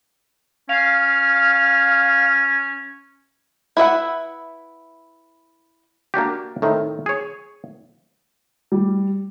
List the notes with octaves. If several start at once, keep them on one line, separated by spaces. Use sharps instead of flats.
C#4 F5
E4 B4 E5 F#5
A#3 D4 F#4 G4
A2 D#3 C4
G#4 C#5
G3